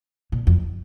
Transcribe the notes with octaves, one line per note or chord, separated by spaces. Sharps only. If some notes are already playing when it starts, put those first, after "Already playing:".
A#2
F2